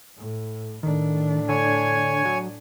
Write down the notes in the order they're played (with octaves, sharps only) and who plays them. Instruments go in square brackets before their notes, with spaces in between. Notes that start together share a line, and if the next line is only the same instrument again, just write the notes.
[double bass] A2
[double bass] A2 D4 [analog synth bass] D#3
[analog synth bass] D3 [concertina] C#5 G#5
[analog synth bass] F#3